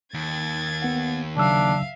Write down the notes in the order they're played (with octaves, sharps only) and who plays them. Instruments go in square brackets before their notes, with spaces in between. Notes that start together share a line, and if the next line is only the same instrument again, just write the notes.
[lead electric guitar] D#2 [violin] G#6 A6
[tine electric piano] B3 F#5
[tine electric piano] C#3 F#3 E6 [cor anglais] D4 [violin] E5 F5